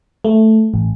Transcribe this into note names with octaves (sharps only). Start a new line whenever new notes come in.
A3
A1